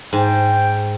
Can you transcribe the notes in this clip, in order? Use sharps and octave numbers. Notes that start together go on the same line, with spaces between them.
G#2 G5